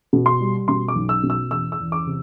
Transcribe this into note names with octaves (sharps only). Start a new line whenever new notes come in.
B2
C6
G3
B2 C6
D6
B1
E6
B2
E6
E2 E6
E6
E2
D6
C3